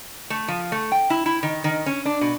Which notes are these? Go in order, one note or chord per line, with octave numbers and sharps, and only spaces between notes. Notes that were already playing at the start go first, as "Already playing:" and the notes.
A3
F3
A3
G5
E4
E4
D#3
D#3
C#4
D4
B2